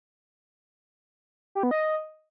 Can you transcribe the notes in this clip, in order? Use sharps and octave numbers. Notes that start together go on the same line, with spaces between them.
G4
B3
D#5